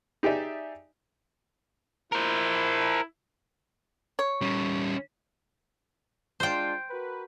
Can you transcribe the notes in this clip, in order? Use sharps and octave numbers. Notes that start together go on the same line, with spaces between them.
D#4 G4 G#4 D5 E5
E4 A#4 C5
C#5
G3 C#4
G#3 D4 F4 C5 G5
F#4 A#4 B4